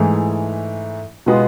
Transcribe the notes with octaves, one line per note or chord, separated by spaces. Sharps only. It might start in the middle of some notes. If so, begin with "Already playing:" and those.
Already playing: G#2 E3 A3 E4 G#4
B2 G#3 B3 F4 G#4